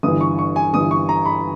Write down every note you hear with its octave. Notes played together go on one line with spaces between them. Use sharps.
G1 G2 E3 D#6
C#6
C#6
G#5
G1 G2 E3 D#6
C#6
A#5
B5